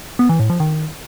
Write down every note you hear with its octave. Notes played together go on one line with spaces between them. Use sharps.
B3
E3
A2
F3
D#3